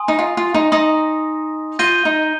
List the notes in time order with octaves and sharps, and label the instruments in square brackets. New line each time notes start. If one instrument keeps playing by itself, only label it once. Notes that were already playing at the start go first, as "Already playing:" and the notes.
Already playing: [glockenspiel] G#5 C6 D#6
[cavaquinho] D#4
F4
F4
D#4
[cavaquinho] D#4 [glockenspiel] C6 D#6 A#6
[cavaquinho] F4 [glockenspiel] G6 A#6 D#7 G7
[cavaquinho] D#4